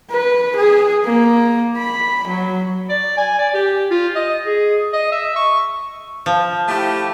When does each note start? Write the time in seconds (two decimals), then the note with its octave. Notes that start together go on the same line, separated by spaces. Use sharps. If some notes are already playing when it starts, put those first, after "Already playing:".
0.11 B4
0.56 G#4
1.04 A#3
1.77 B5
2.28 F#3
2.89 D5
3.17 G#5
3.38 D5
3.54 G4
3.91 F4
4.15 D#5
4.46 G#4
4.93 D#5
5.12 E5
5.36 C#6
6.26 F3
6.68 A3 E4 G4